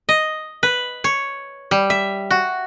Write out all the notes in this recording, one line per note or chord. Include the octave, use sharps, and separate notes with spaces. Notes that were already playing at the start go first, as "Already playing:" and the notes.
D#5
B4
C#5
G3
E5
F#4